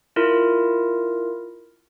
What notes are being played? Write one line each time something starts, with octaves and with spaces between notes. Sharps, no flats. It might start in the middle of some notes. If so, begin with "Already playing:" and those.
E4 F4 A#4